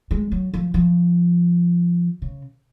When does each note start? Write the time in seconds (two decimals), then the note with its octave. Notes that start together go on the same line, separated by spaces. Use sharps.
0.11 G#3
0.32 F#3
0.54 F3
0.74 F3
2.22 C#3